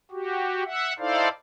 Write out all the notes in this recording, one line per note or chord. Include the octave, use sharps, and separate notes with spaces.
F#4 G4
E5 F#5
D#4 E4 A4 C5 D5 F5